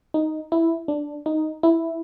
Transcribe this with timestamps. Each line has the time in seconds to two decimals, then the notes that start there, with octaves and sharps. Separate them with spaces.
0.14 D#4
0.52 E4
0.88 D4
1.26 D#4
1.63 E4